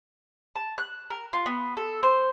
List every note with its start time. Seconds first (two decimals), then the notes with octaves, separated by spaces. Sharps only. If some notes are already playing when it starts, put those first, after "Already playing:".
0.56 A5
0.78 F#6
1.10 A#4
1.33 F4
1.46 B3
1.77 A4
2.03 C5